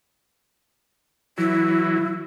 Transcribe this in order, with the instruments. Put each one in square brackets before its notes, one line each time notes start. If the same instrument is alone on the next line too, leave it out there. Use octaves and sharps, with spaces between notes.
[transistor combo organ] E3 F#3 [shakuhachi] E4